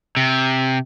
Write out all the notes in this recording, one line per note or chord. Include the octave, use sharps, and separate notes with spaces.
C3